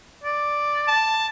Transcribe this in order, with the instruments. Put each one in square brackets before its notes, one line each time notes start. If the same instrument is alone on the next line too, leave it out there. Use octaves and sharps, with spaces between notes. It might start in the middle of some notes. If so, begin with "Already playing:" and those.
[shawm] D5
[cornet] A5